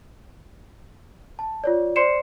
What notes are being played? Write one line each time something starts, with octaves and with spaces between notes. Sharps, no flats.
A5
F4 C#5 D5
C5 D5 C6 C7 C#7 E7